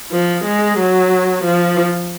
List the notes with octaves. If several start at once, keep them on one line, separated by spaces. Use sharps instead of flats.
F3
G#3
F#3
F3